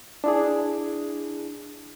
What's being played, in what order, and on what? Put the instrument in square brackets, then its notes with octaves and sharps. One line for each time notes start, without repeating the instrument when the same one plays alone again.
[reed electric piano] D4 E4 G#4